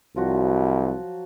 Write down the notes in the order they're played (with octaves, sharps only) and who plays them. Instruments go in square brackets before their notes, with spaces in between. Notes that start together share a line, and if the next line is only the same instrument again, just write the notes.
[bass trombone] C2 [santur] F3 F#3 F#4